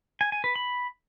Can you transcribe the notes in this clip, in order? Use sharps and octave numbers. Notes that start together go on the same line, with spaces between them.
G#5
G#5
B4
B5